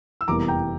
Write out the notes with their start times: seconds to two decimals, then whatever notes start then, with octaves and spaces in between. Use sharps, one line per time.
0.21 E6
0.27 F1 E2 E3 G3 A#3 A#5 D6
0.48 G5 A#5